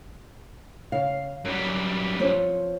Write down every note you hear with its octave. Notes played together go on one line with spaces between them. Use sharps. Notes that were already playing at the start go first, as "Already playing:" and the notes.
C#3 F5
F#2 F#3 G3
F3 C4 C#4